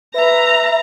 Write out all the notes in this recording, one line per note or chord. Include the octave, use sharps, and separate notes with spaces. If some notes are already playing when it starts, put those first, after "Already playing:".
B4 E5 A#5